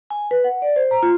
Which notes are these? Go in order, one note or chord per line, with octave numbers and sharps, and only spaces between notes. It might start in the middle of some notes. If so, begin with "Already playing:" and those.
G#5
B4
F#5
D5
C5
A#5
F4